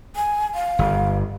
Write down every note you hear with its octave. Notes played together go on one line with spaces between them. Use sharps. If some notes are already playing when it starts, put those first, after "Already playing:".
G#5
F5
G1